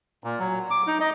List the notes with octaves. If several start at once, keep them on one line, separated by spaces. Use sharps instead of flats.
A#2
F#3
D6
D#4
D#5